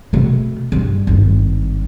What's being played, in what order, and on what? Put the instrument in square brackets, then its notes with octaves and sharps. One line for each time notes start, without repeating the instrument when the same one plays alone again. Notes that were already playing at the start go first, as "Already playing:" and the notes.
[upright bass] B2 A3
G2
G#1 G2